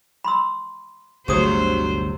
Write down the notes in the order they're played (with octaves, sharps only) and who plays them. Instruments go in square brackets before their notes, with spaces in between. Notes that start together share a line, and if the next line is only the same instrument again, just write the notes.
[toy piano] B5 C6 E6
[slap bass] G1 D2 [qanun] C3 C#5 [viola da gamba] F#3 C5 [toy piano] G#4 D#6